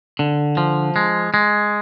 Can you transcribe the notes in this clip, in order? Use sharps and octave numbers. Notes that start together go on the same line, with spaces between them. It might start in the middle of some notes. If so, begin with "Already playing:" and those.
D3
F3
G#3
G#3